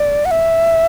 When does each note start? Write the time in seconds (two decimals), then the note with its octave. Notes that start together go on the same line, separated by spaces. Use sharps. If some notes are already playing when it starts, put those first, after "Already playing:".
Already playing: D5
0.25 F#5
0.31 E5